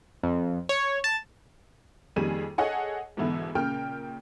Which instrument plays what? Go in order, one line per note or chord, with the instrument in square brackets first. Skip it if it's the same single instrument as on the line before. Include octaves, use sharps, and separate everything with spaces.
[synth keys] F2
C#5
A5
[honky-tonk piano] F2 D#3 G3 A#3 G#4 D#7
G#4 A4 C#5 D#5 F#5 G#5
G#2 B2 D3 E3 B3 E4
A#2 C#3 A#4 G5 F6